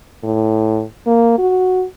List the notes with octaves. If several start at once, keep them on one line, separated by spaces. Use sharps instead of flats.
A2
A#3
F#4